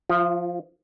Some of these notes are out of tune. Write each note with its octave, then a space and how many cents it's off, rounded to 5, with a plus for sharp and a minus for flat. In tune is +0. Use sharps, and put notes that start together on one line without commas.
F3 +5 F4 -35